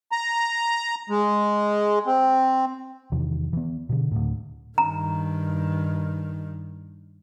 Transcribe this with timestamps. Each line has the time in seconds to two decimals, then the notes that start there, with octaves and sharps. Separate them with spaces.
0.12 A#5
1.10 G#3
2.06 C4
3.12 E2 C3 D#3 E3
3.53 E3 B3
3.89 B2 D3
4.11 D2 A2
4.78 G2 D#3 A#5